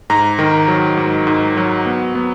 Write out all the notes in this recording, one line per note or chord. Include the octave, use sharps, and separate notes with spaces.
G#2 A#5
D#3
F#3
G#2
G#2
F#3
B3
B3